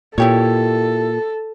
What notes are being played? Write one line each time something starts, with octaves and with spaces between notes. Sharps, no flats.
A#2 E4 G4 A4 C#5